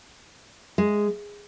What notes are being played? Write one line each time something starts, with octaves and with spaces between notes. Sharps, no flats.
G#3